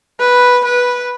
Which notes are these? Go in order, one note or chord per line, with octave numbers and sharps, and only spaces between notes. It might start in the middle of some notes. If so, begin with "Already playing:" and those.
B4
B4